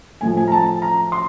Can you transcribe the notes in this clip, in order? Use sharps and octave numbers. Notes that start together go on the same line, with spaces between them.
A2 F3 G#5
G#5
A#5
A5
A#5
C6